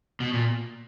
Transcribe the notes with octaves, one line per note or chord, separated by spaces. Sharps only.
B2
A#2